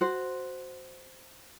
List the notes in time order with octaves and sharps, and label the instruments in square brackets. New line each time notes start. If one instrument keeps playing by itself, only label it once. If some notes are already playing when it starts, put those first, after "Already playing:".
[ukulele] F#4 C5